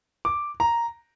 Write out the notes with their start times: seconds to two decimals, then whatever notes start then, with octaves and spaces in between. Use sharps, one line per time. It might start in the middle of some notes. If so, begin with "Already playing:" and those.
0.25 D6
0.60 A#5